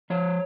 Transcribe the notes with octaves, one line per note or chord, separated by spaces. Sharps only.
F3 C#5